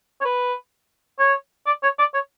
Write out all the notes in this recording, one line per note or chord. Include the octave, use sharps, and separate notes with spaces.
C#5
B4
C#5
D5
C#5
D5
C#5